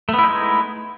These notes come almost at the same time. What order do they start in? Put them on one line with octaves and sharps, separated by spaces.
A3 B3 E4 D#4 G#3